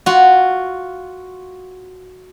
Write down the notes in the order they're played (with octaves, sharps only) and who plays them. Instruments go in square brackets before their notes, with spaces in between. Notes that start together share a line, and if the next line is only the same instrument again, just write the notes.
[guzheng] F4 F#4